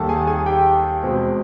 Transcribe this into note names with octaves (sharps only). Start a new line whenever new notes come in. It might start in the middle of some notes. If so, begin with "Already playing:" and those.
Already playing: D#2 D#3 G3 A4 A5
G#4 G#5
G#4 G#5
G4 G5
E2 B2 G#3 C4